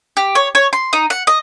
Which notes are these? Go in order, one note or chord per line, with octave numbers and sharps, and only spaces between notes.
G4
C#5
C#5
C6
D#4
F#5
D#5